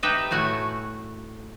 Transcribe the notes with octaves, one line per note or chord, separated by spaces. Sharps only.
D#4 G4 B4 D#5 E5 G5
A2 A3 F#4 F#5 G#5